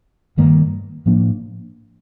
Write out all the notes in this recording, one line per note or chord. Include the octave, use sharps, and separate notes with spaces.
G2 D#3 G3 A#3
A2 F3 A#3 D4